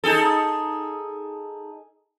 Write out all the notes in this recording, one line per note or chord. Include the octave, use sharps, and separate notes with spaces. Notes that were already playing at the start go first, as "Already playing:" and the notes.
D#4 G#4 A4